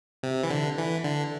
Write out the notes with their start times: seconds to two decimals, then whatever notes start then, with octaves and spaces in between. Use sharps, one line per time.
0.23 C3
0.44 E3
0.50 D3
0.78 E3
1.04 D3